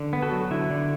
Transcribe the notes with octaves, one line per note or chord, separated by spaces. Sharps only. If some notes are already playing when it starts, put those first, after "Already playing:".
Already playing: D3
B3
F#4 A4
F#3
D3 E4
D3